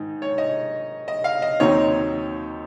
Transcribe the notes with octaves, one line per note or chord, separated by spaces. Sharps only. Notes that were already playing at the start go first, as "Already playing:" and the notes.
Already playing: G#2 D#3 D#4
C#5
D#5
D#5
F5
D#5
D#2 D#3 F#3 C4 D#4 C#5